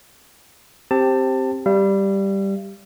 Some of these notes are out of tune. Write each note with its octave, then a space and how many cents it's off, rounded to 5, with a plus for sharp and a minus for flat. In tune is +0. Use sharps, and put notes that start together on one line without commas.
C4 +10 G4 +0 A5 +20
G3 +0 F5 -45